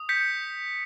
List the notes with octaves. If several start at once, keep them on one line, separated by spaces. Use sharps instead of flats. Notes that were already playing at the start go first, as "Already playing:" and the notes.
Already playing: D#6
G6 B6 C#7